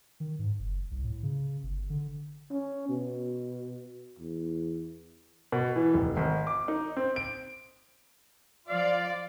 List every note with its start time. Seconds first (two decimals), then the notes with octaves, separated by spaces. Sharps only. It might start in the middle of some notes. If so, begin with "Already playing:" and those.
0.20 D#3
0.39 G#2
0.59 F#1
0.91 C2
1.04 A2
1.23 C#3
1.63 G1
1.90 D3
2.51 C#4
2.89 B2
4.19 E2
5.52 B2
5.76 E3
5.94 F1
6.17 G#1
6.47 D6
6.68 D#4
6.97 C4
7.16 D7
8.68 F3 F4 D5 F5